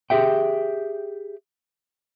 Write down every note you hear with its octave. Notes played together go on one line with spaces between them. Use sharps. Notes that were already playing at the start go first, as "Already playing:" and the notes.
G4 G#4 E5 G5